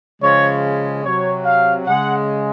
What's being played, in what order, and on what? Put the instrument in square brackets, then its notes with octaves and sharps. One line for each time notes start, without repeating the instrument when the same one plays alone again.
[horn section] C#3 F3 G#3 C#5
C3 F#3 C#5
F5
C#3 G#3 F#5